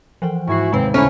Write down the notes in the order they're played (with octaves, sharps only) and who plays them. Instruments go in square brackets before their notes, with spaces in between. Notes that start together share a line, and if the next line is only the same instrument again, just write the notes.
[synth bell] E3 F3 [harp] C5 F#5 G5
[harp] G#2 G#5 C7 [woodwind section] E4 F#4
[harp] D#2 A2 C3 [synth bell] G#3 B4 [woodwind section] C4
[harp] C#2 C6 [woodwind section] A3 E4 [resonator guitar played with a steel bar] C#4 [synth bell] C5 G#5 A#5